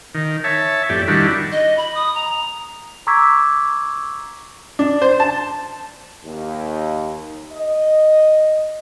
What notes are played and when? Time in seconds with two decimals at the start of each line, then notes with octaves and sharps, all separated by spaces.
0.15 D#3
0.44 C#5 E5 A5
0.90 F2 A2 G4 D5
1.08 D#3 G3 D4 E4 F#4
1.52 D#5
1.77 B5
1.95 D#6
2.15 A#5
3.07 A#5 C#6 D6 E6 G#6 B6
4.79 D4
5.02 C5
5.20 A5
6.25 D#2
7.54 D#5